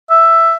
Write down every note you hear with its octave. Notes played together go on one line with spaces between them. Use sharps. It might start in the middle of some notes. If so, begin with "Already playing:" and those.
E5